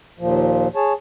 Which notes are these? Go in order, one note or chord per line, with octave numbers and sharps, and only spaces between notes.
D#2 A#2 F3
G#4 C#5 A5